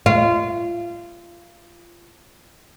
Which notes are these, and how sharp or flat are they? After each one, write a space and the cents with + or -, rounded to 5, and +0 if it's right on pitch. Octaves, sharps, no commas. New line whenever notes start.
F4 -25